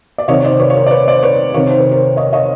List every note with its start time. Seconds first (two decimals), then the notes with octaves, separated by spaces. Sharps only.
0.18 D5
0.28 C3 D#3 C#5 D#5
0.44 C5 D5
0.59 B4 C#5
0.70 C#5
0.75 A#4 C5
0.86 D5
0.91 B4 C#5
1.08 C5 D5
1.23 B4 C#5
1.54 C3 D#3 C#5
1.68 C5
1.79 B4
1.91 A#4 C5
2.17 C#5 D#5
2.33 C#5 D#5